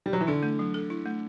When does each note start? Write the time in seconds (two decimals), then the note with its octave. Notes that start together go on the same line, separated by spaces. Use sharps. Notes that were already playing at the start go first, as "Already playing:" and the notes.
0.06 G3
0.13 F#3
0.21 E3
0.27 D3 E4
0.43 A3
0.59 F#3
0.74 A4
0.90 E4
1.06 A3